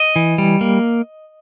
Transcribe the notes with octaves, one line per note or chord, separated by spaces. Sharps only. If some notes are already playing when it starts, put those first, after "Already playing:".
Already playing: D#5
E3
G3
A#3